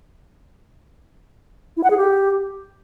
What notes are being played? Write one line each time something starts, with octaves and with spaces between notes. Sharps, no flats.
E4
F#5
G#4
G4